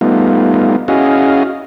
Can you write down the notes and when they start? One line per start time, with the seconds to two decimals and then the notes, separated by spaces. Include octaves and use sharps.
0.01 G3 A3 B3 D#4 F4
0.88 C#4 E4 F#4 G#4 D#5 F5